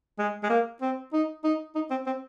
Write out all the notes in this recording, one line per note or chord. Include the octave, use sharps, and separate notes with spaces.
G#3
G#3
A#3
C4
D#4
D#4
D#4
C4
C4